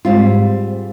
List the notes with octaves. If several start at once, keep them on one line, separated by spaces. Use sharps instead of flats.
G#2 G3 C4 F4